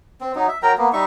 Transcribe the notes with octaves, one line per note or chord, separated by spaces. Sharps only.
C4
F#3 D#4
E5
F#3 A#4 G5 A#5
A#3 B3
G3 D#4 E5 C#6